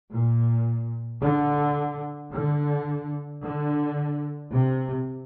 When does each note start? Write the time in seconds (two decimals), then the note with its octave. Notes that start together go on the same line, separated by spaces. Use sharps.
0.10 A#2
1.21 D3
2.32 D3
3.42 D3
4.52 C3